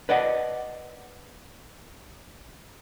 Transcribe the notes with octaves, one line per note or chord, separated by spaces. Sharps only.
B4 D5 D#5 F#5